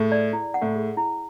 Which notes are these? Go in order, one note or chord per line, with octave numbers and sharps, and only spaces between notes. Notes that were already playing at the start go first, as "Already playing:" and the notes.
Already playing: A2 G#4
D5
E4
F#5
A2
G#4
E4